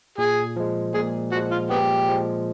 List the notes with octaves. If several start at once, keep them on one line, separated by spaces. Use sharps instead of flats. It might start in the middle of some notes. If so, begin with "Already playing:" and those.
A#2 G#4
F3 G#3
A#2 G#4
F3 G#3 F#4
F4
A#2 B3 G4
F3 G#3